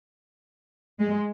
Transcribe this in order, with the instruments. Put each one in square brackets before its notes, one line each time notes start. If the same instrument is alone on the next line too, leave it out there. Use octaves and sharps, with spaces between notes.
[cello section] G#3